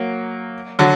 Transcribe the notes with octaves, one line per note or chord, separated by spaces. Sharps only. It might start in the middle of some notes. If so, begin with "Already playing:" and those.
Already playing: F#3 A#3
D3 F#3